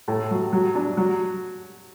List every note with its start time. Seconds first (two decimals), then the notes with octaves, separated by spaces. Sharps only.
0.08 A2
0.31 F#3
0.53 F#3
0.75 D4
0.97 F#3